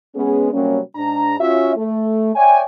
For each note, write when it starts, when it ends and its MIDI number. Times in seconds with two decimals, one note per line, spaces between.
0.15 0.49 56
0.15 0.49 59
0.15 0.49 61
0.15 0.49 68
0.52 0.79 48
0.52 0.79 54
0.52 0.79 55
0.52 0.79 58
0.52 0.79 61
0.96 1.35 44
0.96 1.35 62
0.96 1.35 82
1.40 1.75 61
1.40 1.75 65
1.40 1.75 66
1.40 1.75 76
1.76 2.34 57
2.35 2.62 73
2.35 2.62 74
2.35 2.62 76
2.35 2.62 79
2.35 2.62 80